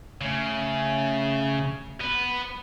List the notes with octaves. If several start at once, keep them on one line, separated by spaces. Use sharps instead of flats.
C#3 A3
B3